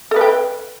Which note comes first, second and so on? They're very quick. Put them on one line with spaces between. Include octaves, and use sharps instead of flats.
A4 B4 G5